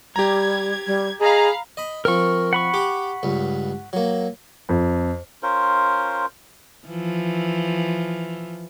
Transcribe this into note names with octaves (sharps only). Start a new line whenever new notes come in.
G3 G4 A#5 G#6
G3
G#4 D#5 F5 A#5 B5
D#5 B5
F3 C4 A#4 C#6
F#5 B5 C#6
G4 D6
C#2 G2
F#3 A#3
F2
C#4 F4 A#4 C5
E3 F3